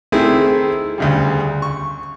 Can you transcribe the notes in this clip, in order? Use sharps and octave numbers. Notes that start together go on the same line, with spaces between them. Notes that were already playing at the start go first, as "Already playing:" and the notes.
D#3 A3 C4 E4 G#4
D2 C#3 G3
C#6